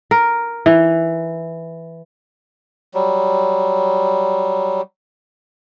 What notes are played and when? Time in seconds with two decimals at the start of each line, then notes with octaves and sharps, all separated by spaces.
0.11 A#4
0.66 E3
2.94 F#3 G3